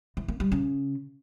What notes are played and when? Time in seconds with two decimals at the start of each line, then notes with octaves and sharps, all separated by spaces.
0.17 E3
0.28 A#3
0.40 G3
0.52 C#3